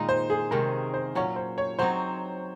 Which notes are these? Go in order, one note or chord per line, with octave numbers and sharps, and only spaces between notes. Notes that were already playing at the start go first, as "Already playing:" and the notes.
Already playing: A#2 D#3 G#3 D#4
C5
G#4
C3 D#3 G#3 C#4 A#4
C5
A#2 F#3 C#4 C#5
C5
C#5
F#3 C4 D#4 C5